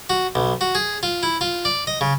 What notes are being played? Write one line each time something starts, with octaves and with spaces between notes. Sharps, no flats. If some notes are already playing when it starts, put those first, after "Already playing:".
F#4
B1
F#4
G#4
F4
E4
F4
D5
D#5
C#3